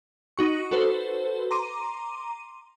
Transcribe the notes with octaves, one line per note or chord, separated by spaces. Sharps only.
D#4 F#4 C#6
F#4 A4 B4 C5
A#5 C6 D6 D#7